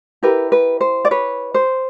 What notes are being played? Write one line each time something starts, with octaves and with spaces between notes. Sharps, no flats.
E4 G4 A#4 B4
B4
C5
D5
B4 C#5
C5